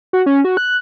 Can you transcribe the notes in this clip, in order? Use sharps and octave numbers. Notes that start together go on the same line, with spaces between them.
F#4
C#4
F#4
F#6